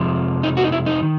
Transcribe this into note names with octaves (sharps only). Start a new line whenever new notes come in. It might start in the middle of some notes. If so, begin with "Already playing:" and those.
Already playing: F2 C3 F3 G#3
D#4
F#4
D#4
E4
D#4
D#3